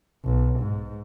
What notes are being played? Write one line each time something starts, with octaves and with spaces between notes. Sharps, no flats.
B1
G#2